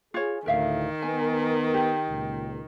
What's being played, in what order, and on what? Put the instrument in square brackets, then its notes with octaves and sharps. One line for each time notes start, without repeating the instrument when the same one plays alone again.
[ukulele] F4 C#5 [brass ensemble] G#4
[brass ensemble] D2 A2 [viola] D#3 [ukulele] A#4 E5 F5
[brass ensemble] B3 A#4 [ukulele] G#5
[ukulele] G4
[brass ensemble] C#2 A#2